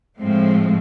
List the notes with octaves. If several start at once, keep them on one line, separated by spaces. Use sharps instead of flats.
A2 F3 G#3 C4